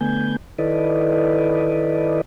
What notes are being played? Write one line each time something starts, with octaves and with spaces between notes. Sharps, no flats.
D3 A3 B3 G#5 G6
D#3 E4 A4 B4 D5 D#5